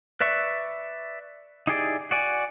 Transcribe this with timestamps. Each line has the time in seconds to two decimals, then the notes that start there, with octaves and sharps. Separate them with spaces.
0.21 B4 D5 E5 C#6
1.67 D#4 E4 G4 G#4 D5
2.11 F#4 D5 G#5